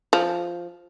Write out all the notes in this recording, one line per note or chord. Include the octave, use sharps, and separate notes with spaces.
F3